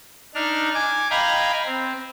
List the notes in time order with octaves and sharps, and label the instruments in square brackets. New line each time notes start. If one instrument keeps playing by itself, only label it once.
[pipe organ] D4 D#4 F6
G#5 D6
D#5 F5 G5 G#5 A#5 B5
C4